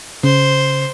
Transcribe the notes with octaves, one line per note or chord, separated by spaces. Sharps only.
C#3 C5